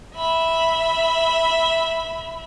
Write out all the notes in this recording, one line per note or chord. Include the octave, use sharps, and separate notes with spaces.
E5 B5